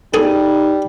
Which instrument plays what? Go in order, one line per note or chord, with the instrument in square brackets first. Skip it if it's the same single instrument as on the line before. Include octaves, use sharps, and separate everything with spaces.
[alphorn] G3 [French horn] D#4 [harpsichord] G#4 A4